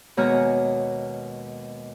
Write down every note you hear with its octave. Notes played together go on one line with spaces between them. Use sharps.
D#2 B2 G#3 C#5 A#5 F6